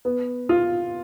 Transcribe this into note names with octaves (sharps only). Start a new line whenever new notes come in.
B3
F4